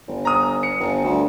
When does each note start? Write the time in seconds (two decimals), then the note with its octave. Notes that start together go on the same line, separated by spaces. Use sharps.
0.08 G1
0.25 A#5 D#6
0.63 C#7
0.80 G1
1.04 D2